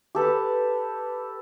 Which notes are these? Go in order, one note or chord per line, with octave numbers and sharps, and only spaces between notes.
G4 A4 B4